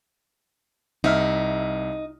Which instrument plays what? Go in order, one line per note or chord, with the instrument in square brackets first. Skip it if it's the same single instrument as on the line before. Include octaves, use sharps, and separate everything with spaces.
[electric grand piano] C2 E5 F6 [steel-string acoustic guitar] D#4